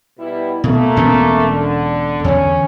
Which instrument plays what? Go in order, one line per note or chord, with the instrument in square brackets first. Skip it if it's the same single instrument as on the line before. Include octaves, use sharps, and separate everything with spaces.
[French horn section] B2 G3 E4
[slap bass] B2 [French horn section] A3 A#3
[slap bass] E1 B2 C#4
[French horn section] D3
[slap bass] E2 D3 [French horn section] C#4